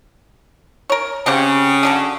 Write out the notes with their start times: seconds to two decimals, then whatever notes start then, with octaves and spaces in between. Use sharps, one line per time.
0.90 A#4 C#5
1.26 C#3 C4 G4 F#5
1.83 D3 F#3 D4